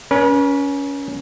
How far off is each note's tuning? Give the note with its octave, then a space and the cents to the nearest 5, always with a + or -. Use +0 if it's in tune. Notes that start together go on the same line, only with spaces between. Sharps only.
C#4 +20 B4 -45